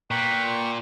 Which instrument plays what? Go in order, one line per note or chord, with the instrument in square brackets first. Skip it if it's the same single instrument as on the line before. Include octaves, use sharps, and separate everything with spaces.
[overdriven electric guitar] A#2 [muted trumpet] B4 [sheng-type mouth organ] G5 C#6